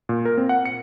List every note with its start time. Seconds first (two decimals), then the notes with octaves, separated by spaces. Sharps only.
0.09 A#2
0.25 A#4
0.38 C4
0.49 F#5
0.65 C#7